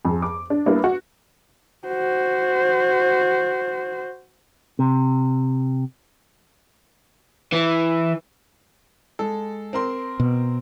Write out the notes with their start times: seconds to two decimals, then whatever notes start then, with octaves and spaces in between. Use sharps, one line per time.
0.05 F2 G#4
0.22 D6
0.50 D4
0.66 G3 A#3 B3 D4 E4
0.84 F#4
1.88 F#4 C5
4.79 C3
7.53 E3
9.19 G#3 A4
9.73 C4 A#4 C6
10.20 B2